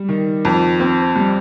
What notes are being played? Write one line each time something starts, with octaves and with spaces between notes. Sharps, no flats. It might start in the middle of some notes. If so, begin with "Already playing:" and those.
Already playing: G3
D#3
F2
C4
G3